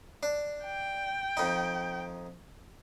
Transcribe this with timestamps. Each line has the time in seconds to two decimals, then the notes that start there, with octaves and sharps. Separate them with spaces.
0.23 D4
0.65 G5
1.37 F2 D#4